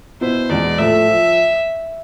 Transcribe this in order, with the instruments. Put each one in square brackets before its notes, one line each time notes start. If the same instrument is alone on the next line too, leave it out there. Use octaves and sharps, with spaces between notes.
[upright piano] B2 B3 E4 [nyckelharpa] C5
[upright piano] E2 B2 G#3 B3 [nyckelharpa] D5
[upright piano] A2 F3 A3 [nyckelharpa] E5
[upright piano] F3